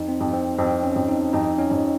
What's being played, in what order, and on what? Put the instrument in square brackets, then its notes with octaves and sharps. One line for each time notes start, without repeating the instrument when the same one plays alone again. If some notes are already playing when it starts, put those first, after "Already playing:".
Already playing: [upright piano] F2 [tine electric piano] D#4
[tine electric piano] C4
[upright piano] F2
[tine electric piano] C4
[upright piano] F2 [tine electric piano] C4
[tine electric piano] C#4
[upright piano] F2
[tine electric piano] D#4
[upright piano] F2 [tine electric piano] D#4
[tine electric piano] C#4
[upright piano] F2